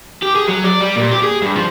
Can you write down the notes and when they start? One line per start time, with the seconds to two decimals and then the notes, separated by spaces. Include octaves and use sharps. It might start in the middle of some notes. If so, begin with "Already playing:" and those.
0.22 G4
0.35 G#4
0.47 F#3
0.64 D5
0.81 G3
0.96 A#2
1.12 G4
1.23 G#4
1.42 G2
1.56 F3